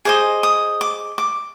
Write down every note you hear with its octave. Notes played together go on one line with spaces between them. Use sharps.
G#4 C5 D#5 D6
D#6
D6
D6